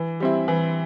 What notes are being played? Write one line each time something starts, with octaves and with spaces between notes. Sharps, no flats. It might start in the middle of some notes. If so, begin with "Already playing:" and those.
Already playing: E3
G3 C4 E4
E3